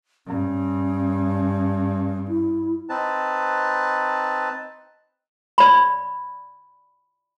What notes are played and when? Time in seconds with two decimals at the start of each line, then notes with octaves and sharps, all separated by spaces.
0.27 G2 C#4
2.28 E4
2.89 C4 D#4 B4 A5
5.58 D5 B5